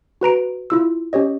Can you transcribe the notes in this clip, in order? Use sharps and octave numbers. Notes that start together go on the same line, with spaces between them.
F#4 B4 A#5 D7
E4 F4 E6
C#4 G4 C#5 D#5